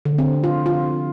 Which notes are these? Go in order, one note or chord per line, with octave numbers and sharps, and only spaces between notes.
D3
C4
F4
F4